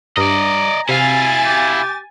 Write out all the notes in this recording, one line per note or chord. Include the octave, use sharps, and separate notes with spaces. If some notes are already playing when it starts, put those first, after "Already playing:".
G2 D5 D#5 A#5
C3 E4 F5 G#5 A6
G4